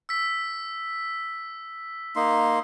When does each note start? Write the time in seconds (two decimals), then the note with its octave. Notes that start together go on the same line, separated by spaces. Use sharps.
0.09 E6 B6
2.16 A#3 D#4 C6